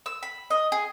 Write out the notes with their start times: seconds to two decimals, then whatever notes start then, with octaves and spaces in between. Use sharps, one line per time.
0.06 E6
0.23 B5
0.50 D#5
0.72 G#4